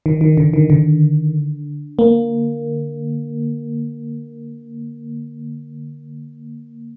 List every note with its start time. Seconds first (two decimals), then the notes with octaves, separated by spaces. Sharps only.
0.06 D#3
0.21 D#3
0.37 D3
0.53 D#3
0.70 D3
1.99 A#3